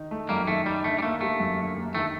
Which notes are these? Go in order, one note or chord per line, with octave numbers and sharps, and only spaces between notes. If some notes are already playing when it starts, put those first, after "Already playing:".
Already playing: D#3 D#4
A3
F#2 G3 A#3
D#3 A3
G3 D#4
D3 A3
G3
A3 A#3
G3 A3
F#2
D3
A#3
D#3 A3